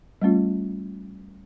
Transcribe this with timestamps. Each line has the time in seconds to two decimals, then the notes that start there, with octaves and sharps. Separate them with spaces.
0.22 G3 A3 C#4 F4